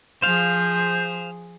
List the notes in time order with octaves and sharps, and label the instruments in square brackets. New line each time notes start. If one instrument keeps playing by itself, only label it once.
[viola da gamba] F3 G#4 [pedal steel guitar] C5 F5 [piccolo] G6